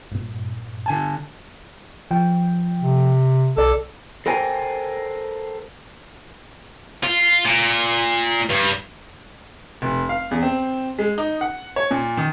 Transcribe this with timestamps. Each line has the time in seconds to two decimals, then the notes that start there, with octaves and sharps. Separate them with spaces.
0.12 G2 A#2
0.86 D3 G#5 A5
2.11 F3 G5
2.81 C3
3.57 B1 A4 D5
4.26 A4 A#4 C5 G5 G#5
7.04 F4
7.45 A#2
8.50 G2
9.82 F1
10.09 F5
10.31 E2
10.42 C4
10.99 G#3
11.18 D#4
11.41 F#5
11.76 C#5
11.91 A#2
12.17 D#3